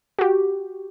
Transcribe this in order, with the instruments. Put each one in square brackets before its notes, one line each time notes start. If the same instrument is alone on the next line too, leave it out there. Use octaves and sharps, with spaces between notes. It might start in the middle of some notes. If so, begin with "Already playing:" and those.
[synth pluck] F#4 G4